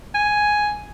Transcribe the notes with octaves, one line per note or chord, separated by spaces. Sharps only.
G#5